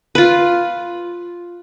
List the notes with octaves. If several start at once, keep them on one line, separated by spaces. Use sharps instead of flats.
F4 B4